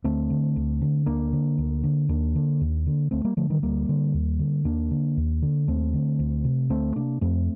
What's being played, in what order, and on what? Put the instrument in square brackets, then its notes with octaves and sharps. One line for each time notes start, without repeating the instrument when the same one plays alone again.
[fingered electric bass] D2 A3 C4
D3
D2
D3
D2 A#3 D4
D3
D2
D3
D#2 A#3 D4
D3
D#2
D3
D2 A3 C4
G3 A#3
D3 F3 A3
D#3 G3
D2 G3 A#3
D3
D#2
D3
D#2 A#3 D4
D3
D#2
D3
D#2 A3 C4
D3
D2
C3
D2 A3 C4
C3 A#3 D4
F2 A3 C4